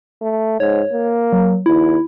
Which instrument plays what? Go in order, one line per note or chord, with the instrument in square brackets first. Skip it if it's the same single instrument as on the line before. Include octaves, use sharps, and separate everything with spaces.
[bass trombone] A3
[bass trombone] G#2 [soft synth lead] C#5
[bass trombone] A#3
[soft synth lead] F#3
[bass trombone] D#2 [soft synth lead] E4